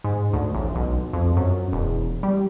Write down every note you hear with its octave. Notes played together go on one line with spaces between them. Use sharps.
G#2
D2
A1
B1
F2
F#2
E1
G3